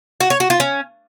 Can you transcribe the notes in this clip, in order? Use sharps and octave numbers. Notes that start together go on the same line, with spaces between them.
F#4
C#5
F#4
F4
C#4